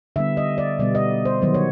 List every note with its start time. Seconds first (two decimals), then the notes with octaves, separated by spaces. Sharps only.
0.16 D3 G3 B3 E5
0.37 D#5
0.58 D5
0.79 B2 G3 B3 D5
0.95 D#5
1.25 C5
1.42 D#3 F#3 B3
1.54 C#5